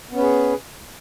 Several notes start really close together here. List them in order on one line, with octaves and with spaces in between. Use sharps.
B3 C#4 B4 G#4